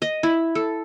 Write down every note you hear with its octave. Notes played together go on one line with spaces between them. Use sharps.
D#5
E4
A4